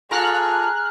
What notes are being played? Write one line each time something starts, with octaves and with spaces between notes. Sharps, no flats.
A#2 F4 G#4 A4 A#5 F6 F#6